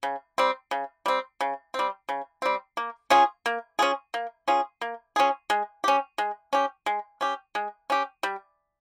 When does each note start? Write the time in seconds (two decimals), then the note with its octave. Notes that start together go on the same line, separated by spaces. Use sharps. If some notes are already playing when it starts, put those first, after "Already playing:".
0.03 C#3
0.38 G3 C4
0.71 C#3
1.06 G3 C4
1.41 C#3
1.74 G3 C4
2.09 C#3
2.42 G3 C4
2.77 A#3
3.10 C#4 F4 G#4
3.46 A#3
3.79 C#4 F4 G#4
4.14 A#3
4.48 C#4 F4 G#4
4.81 A#3
5.16 C#4 F4 G#4
5.50 G#3
5.84 C#4 G4
6.18 G#3
6.53 C#4 G4
6.86 G#3
7.21 C#4 G4
7.55 G#3
7.90 C#4 G4
8.23 G3